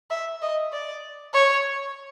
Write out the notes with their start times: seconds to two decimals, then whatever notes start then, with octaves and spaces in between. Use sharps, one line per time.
0.10 E5
0.42 D#5
0.72 D5
1.34 C#5